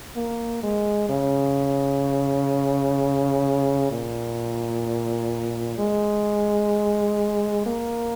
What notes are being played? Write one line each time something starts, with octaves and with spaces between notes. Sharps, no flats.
A#3
G#3
C#3
A#2
G#3
A#3